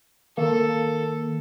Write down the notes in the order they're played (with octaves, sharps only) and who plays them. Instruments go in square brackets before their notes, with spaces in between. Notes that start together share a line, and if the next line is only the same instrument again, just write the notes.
[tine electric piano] D#3 [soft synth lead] A#3 [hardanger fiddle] A4